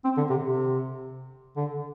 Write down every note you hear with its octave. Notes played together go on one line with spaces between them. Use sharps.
C4
D3
C3
C3
D3